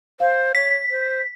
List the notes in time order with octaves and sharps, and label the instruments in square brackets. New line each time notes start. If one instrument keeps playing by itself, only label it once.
[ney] C5 [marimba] F5
[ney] C#5 [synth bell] B6
[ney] C5